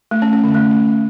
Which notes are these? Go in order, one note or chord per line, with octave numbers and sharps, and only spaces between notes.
A3
C#4
C#4
D3
A3